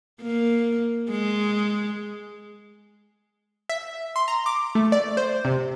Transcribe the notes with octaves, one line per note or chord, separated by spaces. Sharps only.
A#3
G#3
E5
C6
A#5
D6
A3
D5
C5
C3